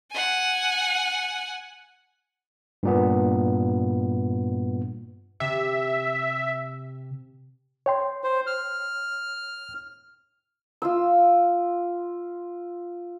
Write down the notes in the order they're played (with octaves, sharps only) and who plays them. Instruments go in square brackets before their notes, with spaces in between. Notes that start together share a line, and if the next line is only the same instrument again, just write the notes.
[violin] F#5 G#5
[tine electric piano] G2 A#2 B3
[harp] C3 [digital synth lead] E5
[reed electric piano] C#5 G5 C6
[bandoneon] C5
F6
[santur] F4 C6 E6